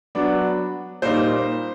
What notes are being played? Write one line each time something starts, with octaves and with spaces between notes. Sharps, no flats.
F#3 B3 D4
A#2 G3 A#3 D#4 C5